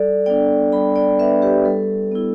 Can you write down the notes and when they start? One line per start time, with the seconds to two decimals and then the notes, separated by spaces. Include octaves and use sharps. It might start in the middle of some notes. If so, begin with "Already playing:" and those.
Already playing: G3 A4 D5
0.26 B3 D4 D5 G5
0.72 G3 G5 B5
0.96 D5 G5
1.19 B3 B4 E5
1.23 D4
1.42 G4 B4
1.65 G3 A4
2.11 B3 E4